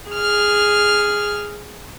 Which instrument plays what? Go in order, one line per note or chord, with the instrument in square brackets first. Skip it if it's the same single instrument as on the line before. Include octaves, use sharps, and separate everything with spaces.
[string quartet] G#4 F6